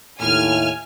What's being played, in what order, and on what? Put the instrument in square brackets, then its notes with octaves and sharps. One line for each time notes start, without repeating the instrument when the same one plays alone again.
[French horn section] D#2 A2 [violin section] G#5 F6